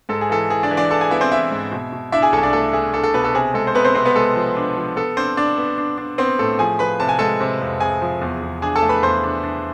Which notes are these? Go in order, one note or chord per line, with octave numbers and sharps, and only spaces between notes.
G#2 A4
G#4
E3 A4
E3 G#4
D4 D5
E3
D4 D5
E3 A4 A5
G#4 G#5
B3 E4 E5
C4 C5
E3 E4 E5
G#2
B2
B2
D4 E4 E5
G#4 G#5
C2 A4 A5
D4 D5
A3 A4
A3 G#4
D4 A4
A4
B2 B3 B4
A4
C3 G#4
G#3 A4
C5
C3 B3 B4
C4 C5
C3 C4 C5
B3 B4
G#3 A4
F3
D4
F3
B3 A4
C4 D4 C5
D4 D5
B3
D4
D4
B3 C4 C5
A2 A4
F3 G#4 G#5
F3 B4 B5
C3 A5
G#5
G#3 A4 A5
C3
F2
C3 G#4 G#5
F3
E2
E2
D4 G#4 G#5
A4 A5
A3
B4 B5
E2 C5 C6
D4
D4